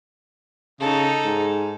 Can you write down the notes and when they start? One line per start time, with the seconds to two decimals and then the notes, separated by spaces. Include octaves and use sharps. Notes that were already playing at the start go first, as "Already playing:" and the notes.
0.80 C#3 D#4 A4
1.25 G#2